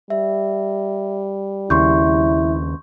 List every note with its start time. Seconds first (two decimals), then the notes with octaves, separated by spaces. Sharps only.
0.10 G3 E5
1.70 D#2 C#3 E4 C6 C#6 G6